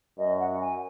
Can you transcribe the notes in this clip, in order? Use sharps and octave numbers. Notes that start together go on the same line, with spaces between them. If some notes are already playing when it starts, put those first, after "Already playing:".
F#2 D#5
F#5
G#5